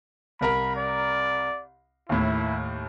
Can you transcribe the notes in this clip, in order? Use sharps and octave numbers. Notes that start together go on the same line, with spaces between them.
C2 A#4 A#5 B5
D5
D#2 A2 E4